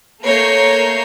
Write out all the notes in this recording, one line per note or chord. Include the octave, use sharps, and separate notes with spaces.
A3 A#3 C#5 A#5 G6 C7